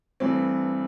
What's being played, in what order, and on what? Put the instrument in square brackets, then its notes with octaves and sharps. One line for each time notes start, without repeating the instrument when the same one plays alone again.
[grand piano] G2 E3 A3 [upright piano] C4